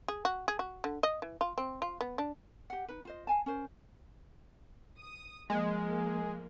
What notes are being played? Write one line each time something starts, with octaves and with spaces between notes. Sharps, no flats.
G#4
F#4
G#4
F#4
D3
D#5
E3
F4
C4
F4
B3
D4
G4 F#5
D#4 B4
F4 C5 D#5
F5 G#5 A5
C#4 A#4 C5
D#6
F3 G#3 A#3